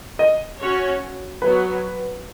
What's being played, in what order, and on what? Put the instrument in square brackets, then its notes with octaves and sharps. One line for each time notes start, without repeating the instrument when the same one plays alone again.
[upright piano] D#5
[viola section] C#4 F#4 C#5
[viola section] F#3 B3 F#4 [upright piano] B4